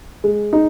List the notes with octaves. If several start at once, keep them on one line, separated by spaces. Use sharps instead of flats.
G#3
D#4